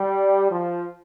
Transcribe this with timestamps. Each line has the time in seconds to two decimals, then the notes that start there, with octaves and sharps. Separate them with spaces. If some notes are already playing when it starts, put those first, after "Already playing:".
Already playing: G3
0.50 F3